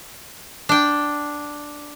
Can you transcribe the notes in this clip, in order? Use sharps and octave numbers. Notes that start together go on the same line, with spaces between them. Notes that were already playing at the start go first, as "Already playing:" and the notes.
D4 G5